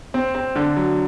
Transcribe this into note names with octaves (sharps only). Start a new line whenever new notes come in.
C4
C4
D3
F#3